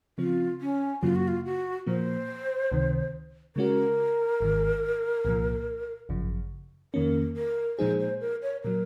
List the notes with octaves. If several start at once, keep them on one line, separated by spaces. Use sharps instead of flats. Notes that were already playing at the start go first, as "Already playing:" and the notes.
C#3 F3 C4 F4
C#4
F#2 C#3 F#3 A#3 F4
F#4
F4
F#4
A#2 F3 A#3 C5
C#2 C3 D#3
C#3 G#3 C#4 F#4 A#4
G#1 G#2 D#3
C2 A#2 F3
G#1 F#2 C#3 F3
F2 D#3 A#3 C#4 A#4
A#4
A#2 F3 G#3 D#4 G#4 C5
C5
A#4
C#5
A#2 F#3 A#4